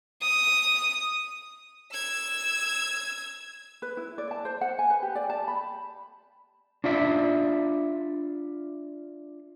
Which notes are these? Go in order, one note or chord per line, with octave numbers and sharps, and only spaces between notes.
D#6
E6 G#6
B4
E4
D5
A5
C5
F#5
G#5
B4
G4
D5
A5
B5
D4 F4 D5 E5